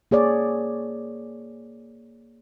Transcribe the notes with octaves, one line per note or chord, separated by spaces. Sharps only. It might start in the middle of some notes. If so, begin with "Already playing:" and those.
A#3 G#4 C#5 D5